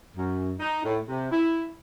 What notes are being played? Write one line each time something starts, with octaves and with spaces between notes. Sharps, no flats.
F#2
D#4
A2
C3
E4